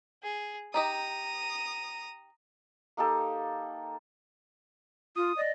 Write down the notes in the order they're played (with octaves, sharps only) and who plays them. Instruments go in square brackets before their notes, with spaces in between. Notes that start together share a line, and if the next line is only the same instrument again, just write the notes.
[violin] G#4
[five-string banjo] D#4 G4 D#5 [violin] A#5 D#6
[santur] A#3 D#4 G4 A4
[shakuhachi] F4 [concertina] D#6
[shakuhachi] D5 [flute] D#5